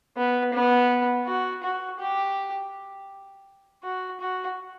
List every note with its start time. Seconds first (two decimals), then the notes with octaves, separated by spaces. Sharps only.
0.17 B3
0.53 B3
1.27 F#4
1.63 F#4
2.00 G4
3.84 F#4
4.20 F#4